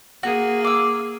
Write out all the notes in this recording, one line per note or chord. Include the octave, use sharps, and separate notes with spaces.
A#3 F#4 G#4
D6 E6